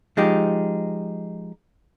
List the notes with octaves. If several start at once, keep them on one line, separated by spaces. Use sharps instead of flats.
F3 G#3 D#4 G4